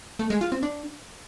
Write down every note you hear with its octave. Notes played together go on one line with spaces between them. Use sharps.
A3
G#3
F4
C4
D4